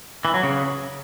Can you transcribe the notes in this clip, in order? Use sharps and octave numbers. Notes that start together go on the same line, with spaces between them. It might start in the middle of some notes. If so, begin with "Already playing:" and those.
E3
F#3
C#3